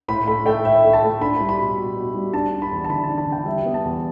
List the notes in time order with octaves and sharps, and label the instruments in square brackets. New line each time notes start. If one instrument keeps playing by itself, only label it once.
[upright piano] A2 [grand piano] B5
[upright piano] A3 [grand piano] B5
[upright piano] A3 [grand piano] G5
[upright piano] A2 [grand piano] E5
[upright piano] A3
[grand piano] A5
[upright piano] A3
[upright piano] D4 [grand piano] B5
[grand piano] B5
[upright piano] G3
[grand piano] B5
[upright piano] B2
B2
B2
G3
[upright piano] D4 [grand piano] A5
[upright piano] D4
[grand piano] B5
[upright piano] E2
[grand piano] A5
[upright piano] D3 [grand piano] B5
[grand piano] A5
[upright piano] D4
[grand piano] A5
[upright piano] D3
[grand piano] G5
[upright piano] G3 [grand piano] E5
[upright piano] B3
[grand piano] A5
[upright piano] E2